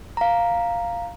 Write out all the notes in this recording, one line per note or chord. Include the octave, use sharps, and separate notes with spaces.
F5 A#5